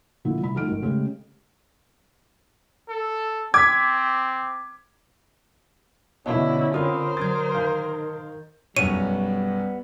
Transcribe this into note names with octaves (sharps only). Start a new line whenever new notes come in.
A#2 D3 F3 E4
C2 B5
D2 F3 D#4 A4 F6 D7
G#1
C#3 G#3 A3 C#4 G4 G#4
A4
C4 D6 G#6 B6
B2 D3 C#4 E4 D#5
C4 F4 A#4 C5 B5 D#6
D3 F#3 D#6 G#6 A6
D#3 F5 G6
B1 F#2 G3 B3 C#4 C#5 D#7